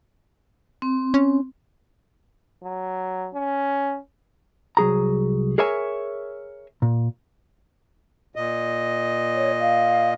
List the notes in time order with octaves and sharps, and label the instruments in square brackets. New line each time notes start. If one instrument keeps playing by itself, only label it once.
[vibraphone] C4
[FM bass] C#4
[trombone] F#3
C#4
[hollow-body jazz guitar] C2 F#3 G#4 A#5
G#4 A#4 C#5 E5 G#5
A#2
[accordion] A#2 D#5
[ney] C#5
F5